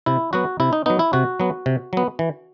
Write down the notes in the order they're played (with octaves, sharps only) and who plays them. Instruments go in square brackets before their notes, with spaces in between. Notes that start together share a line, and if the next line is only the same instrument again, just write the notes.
[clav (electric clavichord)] C3 E4
F#3 B3 F#4
C3 E4
D#4
F#3 B3 D#4
E4
C3 F#4
F#3 B3
C3
F#3 B3
E3